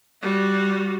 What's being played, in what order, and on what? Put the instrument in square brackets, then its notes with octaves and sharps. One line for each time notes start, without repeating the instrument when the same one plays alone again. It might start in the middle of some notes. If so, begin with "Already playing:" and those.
[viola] G3 F#4